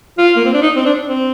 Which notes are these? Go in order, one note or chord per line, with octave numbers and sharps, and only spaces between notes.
F4
A#3
C4
D4
D#4
C4
D4
C4